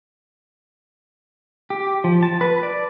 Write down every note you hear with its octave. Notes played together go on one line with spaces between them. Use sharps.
G4
F3
A5
B4
D5